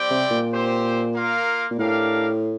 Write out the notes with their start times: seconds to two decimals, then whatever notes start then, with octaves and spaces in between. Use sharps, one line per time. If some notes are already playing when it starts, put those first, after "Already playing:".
Already playing: G3 C4 G4 D5 G5
0.10 C3
0.31 A#2
0.52 C4 G4 C5
1.15 A#3 F4 A#4 F5
1.70 A#2
1.78 A2 D4 G4 A#4 F5